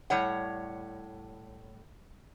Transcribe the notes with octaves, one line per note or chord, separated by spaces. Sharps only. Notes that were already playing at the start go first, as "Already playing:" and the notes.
A2 G3 C#5 F#5